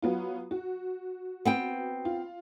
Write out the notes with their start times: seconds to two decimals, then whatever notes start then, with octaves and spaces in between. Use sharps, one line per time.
0.02 F#3 B3 F4
0.51 F#4
1.45 B3 C4 G5
2.05 F4